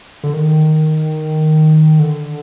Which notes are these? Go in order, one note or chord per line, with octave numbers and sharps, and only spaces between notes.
D3
D#3
D3